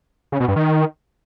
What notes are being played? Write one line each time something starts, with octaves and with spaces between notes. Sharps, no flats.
C#3
B2
G2
D#3